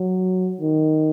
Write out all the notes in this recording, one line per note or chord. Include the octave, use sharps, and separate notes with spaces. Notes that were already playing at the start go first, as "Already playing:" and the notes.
Already playing: F#3
D#3